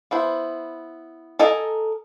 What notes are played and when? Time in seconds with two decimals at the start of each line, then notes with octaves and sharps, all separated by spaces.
0.11 B3 E4 C5
1.39 A4 A#4 D#5 G#5